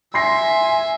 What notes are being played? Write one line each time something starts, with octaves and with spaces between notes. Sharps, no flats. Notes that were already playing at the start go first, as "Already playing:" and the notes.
E5 G#5 C6 A#6 C7